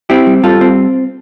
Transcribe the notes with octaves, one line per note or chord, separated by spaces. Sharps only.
C4 E4 G4
G3
G3 F4 A4
C4